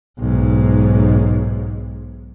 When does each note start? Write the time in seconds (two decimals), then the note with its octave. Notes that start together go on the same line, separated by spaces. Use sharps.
0.19 B1 G#2